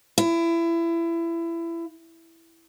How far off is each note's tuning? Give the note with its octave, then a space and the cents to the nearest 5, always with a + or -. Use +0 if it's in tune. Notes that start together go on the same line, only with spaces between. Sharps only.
E4 +25